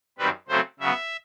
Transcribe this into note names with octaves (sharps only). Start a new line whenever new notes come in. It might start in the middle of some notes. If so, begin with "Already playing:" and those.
F#2 D#3 G3 C4 B4
C#3 F#3 A3 C4 C5
C#3 F#3 B3 E5